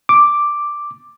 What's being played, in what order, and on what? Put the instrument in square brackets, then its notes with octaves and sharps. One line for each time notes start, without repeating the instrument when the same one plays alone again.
[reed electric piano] D6